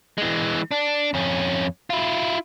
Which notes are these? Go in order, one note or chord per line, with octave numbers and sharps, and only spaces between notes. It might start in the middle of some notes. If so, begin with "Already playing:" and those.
E3 G#3
D4
F2 C#4
E4 F4